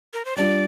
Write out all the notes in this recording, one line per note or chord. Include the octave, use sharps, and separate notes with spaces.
A#4
C5
G3 D4 F4 D5